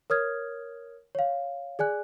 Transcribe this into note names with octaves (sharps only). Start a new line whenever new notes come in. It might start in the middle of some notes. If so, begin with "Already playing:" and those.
A#4 C#5 D#6 F6 G#6
C#5 F5
G#4 D5 G#5 F#6